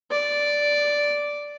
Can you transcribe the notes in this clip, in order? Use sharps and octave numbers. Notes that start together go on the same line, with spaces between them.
D5